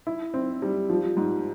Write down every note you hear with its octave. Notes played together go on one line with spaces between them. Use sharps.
E4
C4
G3
F3
G#2